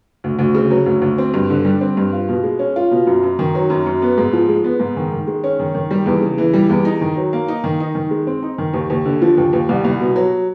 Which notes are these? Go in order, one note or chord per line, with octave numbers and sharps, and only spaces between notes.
D2
D2
C#3
F#3
D2
D2
C4
G2
D3
G3
C4
G2
F4
B2
G#3
C#4
F4
B2
F#2
F#2
D#3
F#3
F#2
F#2
B3
G#2
F3
G#3
B3
G#2
D#3
D#3
G#3
C#4
D#3
D#3
G3
E2
C#3
E3
G3
E2
D#4
D#3
F#3
A#3
D#4
D#3
D#4
D#3
G#3
C4
D#4
D#3
D#2
D#2
D3
F3
D#2
D#2
C2
C2
B2
F#3